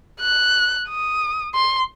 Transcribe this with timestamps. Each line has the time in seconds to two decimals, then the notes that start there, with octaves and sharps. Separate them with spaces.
0.20 F#6
0.88 D#6
1.55 C6